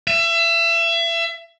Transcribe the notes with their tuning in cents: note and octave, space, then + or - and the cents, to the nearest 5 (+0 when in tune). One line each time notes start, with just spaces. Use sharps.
E5 +30